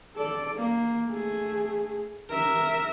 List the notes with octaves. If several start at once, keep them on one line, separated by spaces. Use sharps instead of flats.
A4 D5
A#3
A3 G#4
A#4 E5